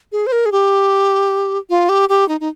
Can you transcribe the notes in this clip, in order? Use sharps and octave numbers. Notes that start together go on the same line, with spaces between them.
G#4
C5
A#4
G#4
G4
F4
G4
G4
D#4
D#4